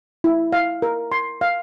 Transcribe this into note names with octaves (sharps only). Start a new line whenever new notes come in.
E4
F5
A#4
C6
F5